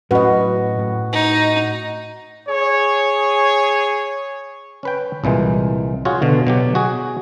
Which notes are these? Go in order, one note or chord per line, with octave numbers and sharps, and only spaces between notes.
A2 F#3 C#4 F#4 B4 D#5
A2
D#4
G#4 C#5
C#4 B4 G5
C2 A#2 E3 G#3
F4 F#4 G#4 C#5
B2 D3
B2 F#3 G4
F#4 G#4